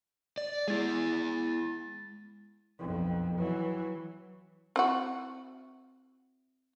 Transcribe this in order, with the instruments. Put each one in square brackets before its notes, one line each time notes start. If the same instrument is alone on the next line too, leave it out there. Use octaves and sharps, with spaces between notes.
[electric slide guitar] D5
[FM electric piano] G#3 A6 [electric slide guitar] E4 G#4
[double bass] B1 F2
E3 F#3
[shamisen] C4 E4 F#4